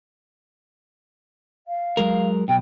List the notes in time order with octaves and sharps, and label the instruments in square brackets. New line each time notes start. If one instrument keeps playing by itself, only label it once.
[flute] F5
[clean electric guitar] F#3 G#3 A#4
[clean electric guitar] B1 B2 [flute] G5